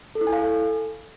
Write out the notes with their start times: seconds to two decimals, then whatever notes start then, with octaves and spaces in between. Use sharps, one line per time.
0.15 A4
0.21 E4
0.27 G#5
0.33 F5
0.38 A4